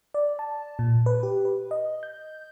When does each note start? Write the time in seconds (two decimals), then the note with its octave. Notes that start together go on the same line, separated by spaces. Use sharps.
0.14 D5
0.39 A5
0.79 A#2
1.06 B4
1.23 G4
1.45 B4
1.71 D#5
2.03 G6